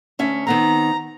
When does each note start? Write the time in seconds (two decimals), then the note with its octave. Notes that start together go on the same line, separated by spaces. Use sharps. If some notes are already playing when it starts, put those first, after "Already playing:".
0.19 D2 C#4 E5
0.47 D#3 B3 C4 A#5